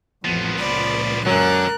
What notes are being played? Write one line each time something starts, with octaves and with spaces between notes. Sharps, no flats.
A1 F2 F3 B3
C#2 A#2 D5 B5
F#2 D3 F#3 A#4 F#6